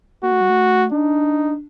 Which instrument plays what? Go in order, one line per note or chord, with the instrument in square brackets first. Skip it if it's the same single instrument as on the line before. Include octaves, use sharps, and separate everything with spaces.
[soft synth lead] A#3 [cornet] F#4
[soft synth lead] A3
G3
A3
[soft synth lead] D4 [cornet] D#4